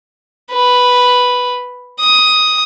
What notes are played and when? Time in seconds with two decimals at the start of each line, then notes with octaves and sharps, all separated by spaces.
0.51 B4
2.00 D#6